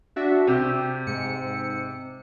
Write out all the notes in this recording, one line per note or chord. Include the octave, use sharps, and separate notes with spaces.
D4 F#4 E5
C3 G4
G#2 C#7